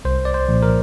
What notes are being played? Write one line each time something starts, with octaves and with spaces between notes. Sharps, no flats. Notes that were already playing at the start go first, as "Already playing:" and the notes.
C2 C5
D5
C5
A#2 F3
A#4